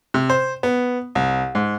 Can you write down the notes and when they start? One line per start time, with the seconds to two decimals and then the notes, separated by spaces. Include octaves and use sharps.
0.14 C3
0.30 C5
0.63 B3
1.15 C2
1.55 G#2